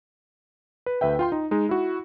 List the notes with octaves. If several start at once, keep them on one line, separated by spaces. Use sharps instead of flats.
B4
D2 B4 E5 G5
F4 G5 C6
D#4
G#3 D#4
E4 F#4